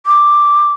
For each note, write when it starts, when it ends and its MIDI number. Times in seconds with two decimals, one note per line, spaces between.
0.06 0.73 86